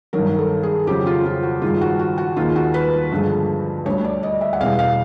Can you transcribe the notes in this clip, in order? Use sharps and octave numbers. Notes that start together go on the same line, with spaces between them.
G2 D#3 F#3 A#4
A4
G#4
F2 C#3 F#3 G4
F4
F4
F#4
G2 D#3 G#3 F4
F#4
F#4
F#4
D#2 D#3 G#3 F4
F#4
B4
G2 D3 F3 G#3
D2 D3 G3 C#5
D5
D#5
E5
F#5
E2 B2 G3 F5
F5